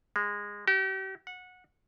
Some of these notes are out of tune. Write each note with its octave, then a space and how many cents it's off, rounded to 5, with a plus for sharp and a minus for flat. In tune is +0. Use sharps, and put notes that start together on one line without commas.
G#3 -20
G4 -40
F#5 -20